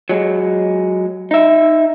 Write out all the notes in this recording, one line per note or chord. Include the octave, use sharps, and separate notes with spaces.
F#3 G#3
D#4 E5